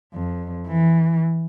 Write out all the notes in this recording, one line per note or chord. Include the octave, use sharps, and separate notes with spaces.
F2
E3